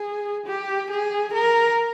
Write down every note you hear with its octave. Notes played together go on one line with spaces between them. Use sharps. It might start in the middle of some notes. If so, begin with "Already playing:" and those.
Already playing: G#4
G4
G#4
A#4